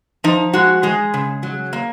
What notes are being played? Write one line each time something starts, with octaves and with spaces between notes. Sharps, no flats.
F3 D#4
G#3 F#4
G#3 G#4
C#3
F#3
A#3